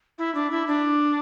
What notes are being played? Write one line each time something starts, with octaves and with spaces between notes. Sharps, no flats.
E4
D4
E4
D4